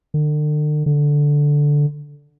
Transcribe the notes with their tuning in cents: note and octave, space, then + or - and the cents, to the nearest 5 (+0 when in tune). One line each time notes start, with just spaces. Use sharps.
D3 +40
D3 -5